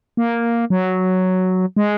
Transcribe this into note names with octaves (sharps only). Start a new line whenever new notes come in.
A#3
F#3
G#3